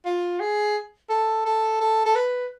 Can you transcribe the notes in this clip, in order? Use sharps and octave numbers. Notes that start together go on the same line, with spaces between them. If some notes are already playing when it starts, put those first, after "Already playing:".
F4
G#4
A4
A4
A4
A4
B4